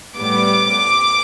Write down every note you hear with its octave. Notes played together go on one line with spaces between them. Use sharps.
A2 G3 B3 D6